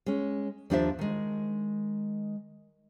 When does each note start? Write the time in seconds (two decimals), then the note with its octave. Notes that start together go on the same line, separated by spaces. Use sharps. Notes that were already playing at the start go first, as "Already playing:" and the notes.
0.06 G#3 C#4
0.70 D#2 F3 D4 F4 C5 E5
0.99 D#3 G#3